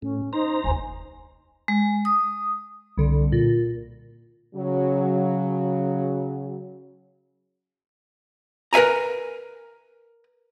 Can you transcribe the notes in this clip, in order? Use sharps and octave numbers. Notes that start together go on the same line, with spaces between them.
A2 C#4
D#4 C5 A#5
F1 D#2 G#5
G#3
D#6
C2 D3
A#2
C#3 F#3
A#4 B4 E5 G#5 A#5